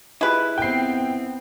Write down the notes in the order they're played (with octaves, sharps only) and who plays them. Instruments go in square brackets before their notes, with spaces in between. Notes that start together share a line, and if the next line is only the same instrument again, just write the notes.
[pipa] G#3 B4 [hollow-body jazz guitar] E4 F4 G4
[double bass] B3 C4 [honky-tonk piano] G5 C7